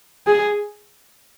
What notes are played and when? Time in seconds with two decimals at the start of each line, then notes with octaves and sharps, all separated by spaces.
0.27 G#4